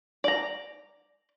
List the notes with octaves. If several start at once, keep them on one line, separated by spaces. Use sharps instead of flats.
D5 A#5